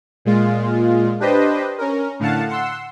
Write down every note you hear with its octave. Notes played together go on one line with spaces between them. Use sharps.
A#2 G#3 F4
D4 G4 B4 C5 D#5
C#4 A#4
A2 D3 F5 F#5 A5
F#5 C6 E6